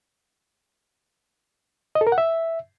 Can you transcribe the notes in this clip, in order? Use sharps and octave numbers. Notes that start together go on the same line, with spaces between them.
D#5
A4
A#4
F#5
E5